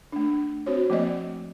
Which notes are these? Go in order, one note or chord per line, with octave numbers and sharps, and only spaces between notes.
A3 D4
C4 F#4 C5 C#5
F3 A3 A#3 C4 D5 D#5